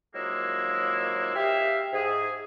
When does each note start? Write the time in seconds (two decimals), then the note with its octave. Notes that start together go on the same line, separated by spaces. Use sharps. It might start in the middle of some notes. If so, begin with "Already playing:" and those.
0.15 D#3 F3 F#3 G#3 A#3 E4
1.35 G4 E5 F5
1.93 G#2 G#4